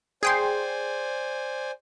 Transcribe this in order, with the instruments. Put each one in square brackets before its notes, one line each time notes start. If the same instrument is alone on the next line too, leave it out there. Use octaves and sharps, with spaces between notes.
[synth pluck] G#4 G5 C6 [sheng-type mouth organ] C5 D5 G#5